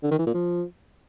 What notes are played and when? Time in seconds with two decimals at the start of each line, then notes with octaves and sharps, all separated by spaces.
0.03 D3
0.11 D#3
0.19 E3
0.26 A#2
0.34 F3